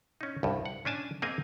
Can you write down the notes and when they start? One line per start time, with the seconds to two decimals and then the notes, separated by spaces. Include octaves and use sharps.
0.21 C#4 D#4
0.43 C2 G2
0.66 F#5
0.85 C#4 D4 G#5 A5
1.22 A#3 C4 G#4 D#5 F5 G#5